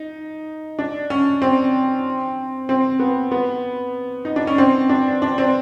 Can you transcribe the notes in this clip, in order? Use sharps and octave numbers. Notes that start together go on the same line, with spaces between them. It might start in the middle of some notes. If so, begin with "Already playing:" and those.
Already playing: D#4
D4
C#4
C4
C4
B3
B3
D#4
D4
C#4
C4
D4
D4
C4